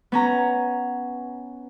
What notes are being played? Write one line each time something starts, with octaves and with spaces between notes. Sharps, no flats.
B3 C#4 A#5